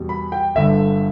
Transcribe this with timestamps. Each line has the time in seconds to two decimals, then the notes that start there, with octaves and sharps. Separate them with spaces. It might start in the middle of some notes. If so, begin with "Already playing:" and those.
Already playing: E2 B2 G3
0.09 B5
0.32 G5
0.55 G1 G2 D3 E5